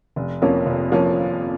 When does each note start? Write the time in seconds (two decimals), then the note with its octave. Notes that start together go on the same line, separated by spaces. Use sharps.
0.16 F1
0.42 F2 F3 A#3 C#4
0.66 F1
0.92 F3 A#3 C#4